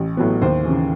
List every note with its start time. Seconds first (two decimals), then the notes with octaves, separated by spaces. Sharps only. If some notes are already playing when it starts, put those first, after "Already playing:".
Already playing: A1
0.17 A2 F#3 B3
0.41 D#2 C5
0.64 C#3 E3